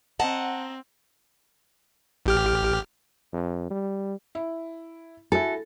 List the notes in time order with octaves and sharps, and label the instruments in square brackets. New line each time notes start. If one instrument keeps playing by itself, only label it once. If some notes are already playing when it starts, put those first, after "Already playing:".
[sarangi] C4 [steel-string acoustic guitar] D#5 A5 A#5 [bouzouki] F#5
[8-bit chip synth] A1 G4 F6
[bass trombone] F2
G3
[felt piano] E4
[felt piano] E4 F#4 G#5 [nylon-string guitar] A4